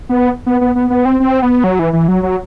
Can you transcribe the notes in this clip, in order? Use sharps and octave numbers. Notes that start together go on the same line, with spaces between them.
B3
B3
B3
B3
B3
C4
C4
B3
F#3
E3
E3
F#3
F#3